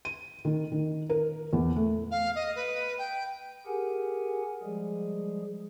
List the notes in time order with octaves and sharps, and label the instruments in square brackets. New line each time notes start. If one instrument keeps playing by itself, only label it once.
[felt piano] D#7
D#3
D#3
A#4
E2
A3
[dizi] F5
D#5
B4
G5
[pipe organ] G4 G#4 A#4 F#5 G#5
F3 G3 G#3 G#4